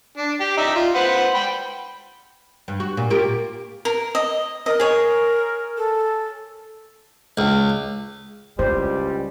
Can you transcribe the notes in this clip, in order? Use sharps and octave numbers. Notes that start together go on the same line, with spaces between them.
D4
G4
D#4 D5 E5
F4
B4 C5 F#5
G5 B5
G2
F#4
A#2
A#3 F4 G4
A#4
D#5
A#4 D#5
G#4 C#5
A4
C#2
C#2 G3 E4 C5